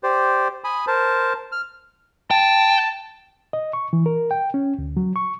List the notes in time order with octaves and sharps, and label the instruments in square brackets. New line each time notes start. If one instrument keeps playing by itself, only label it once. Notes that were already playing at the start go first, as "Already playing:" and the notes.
[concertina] G4 C5 D5
G#5 B5 D#6
A#4 C5 A5
F6
[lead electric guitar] G5 [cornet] A5
[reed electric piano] D#5
C#6
E3
A#4
G5
C#4
D2
F#3
C#6